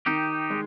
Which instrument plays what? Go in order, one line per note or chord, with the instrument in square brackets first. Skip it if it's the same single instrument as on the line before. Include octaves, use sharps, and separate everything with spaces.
[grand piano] D#3 [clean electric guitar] D#4 G4
[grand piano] G#3